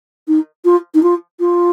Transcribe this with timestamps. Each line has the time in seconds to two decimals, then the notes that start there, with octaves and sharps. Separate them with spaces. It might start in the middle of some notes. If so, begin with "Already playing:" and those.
0.28 D#4
0.65 F4
0.95 D#4
1.03 F4
1.40 F4